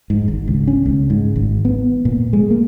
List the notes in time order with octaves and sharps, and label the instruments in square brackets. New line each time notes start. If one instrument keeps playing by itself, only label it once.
[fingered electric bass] G#2
G#1
C#2
C#4
C#2
G#2
G#1
B3
A#2
G#3
A#3